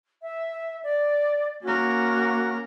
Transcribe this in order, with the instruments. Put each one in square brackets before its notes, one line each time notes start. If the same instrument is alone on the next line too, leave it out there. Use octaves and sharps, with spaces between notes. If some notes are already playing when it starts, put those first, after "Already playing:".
[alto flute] E5
D5
[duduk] A#3 [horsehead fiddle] C#4 A#4 [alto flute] F#4